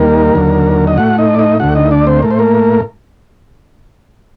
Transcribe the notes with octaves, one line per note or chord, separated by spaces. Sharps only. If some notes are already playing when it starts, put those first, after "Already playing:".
Already playing: D#2 D#3 G3 A#3 A#4
D#2 D3 F#3
D#5
A2 A3 F#4 F#5
D#4 D#5
D5
D#4 D#5
D2 D3 A3 F#4 F#5
D#4 D#5
D4 D5
C4 C5
A2 A3 A#4
C5
A#3 A#4